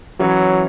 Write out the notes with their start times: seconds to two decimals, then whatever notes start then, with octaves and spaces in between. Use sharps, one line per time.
0.19 E3 F#3 C#4 E4